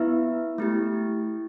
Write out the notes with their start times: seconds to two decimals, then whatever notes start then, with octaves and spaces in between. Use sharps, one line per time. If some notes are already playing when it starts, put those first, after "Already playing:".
Already playing: B3 E4 B4 E5
0.58 A3 E4 G4